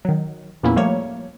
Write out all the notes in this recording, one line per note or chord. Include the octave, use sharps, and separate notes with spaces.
D#3 F#3
E2 A#2 A#3 B3 C#4 E4
F3 G3 A3 A#3 C#5